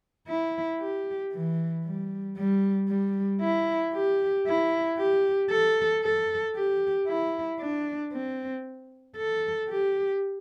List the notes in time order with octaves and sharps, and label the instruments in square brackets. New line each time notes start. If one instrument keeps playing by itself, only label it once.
[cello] E4
G4
E3
G3
G3
G3
E4
G4
E4
G4
A4
A4
G4
E4
D4
C4
A4
G4